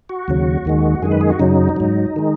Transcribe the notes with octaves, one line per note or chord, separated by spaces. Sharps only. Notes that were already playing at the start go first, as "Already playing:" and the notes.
F#4
D#2 C#3 F#3
D#2 D#3 G#3
F#2 D#3 G#3 G#4
B4
G#4
F#4
F#2 C#3 F#3 D#4
G#2 F#3
D#3 G#3